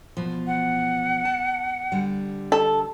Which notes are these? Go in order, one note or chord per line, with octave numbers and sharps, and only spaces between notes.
E2 B2 F3
F#5
A5
D3 G3
A4